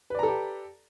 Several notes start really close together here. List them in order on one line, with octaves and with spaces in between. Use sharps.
B4 D5 A#5 A4 G4